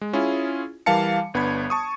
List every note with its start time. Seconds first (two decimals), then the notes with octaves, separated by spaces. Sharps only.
0.01 G#3
0.13 C#4 E4 F4 G#4
0.86 E3 G3 A#4 F5 A5 C#7
1.34 G1 B3 D4 B5 G#6
1.70 A5 C#6 D#6